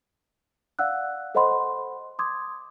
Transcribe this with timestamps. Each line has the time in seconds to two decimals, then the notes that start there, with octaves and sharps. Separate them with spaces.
0.79 D5 F5 F#5 E6 F#6
1.35 A4 C5 D#5 F#5 B5 C6
2.19 C6 D6 D#6 G#6